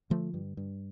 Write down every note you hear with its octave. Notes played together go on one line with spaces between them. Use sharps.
D3 F3 A3
G2
G2